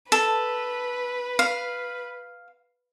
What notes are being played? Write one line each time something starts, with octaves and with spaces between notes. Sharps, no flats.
A4 B4
F5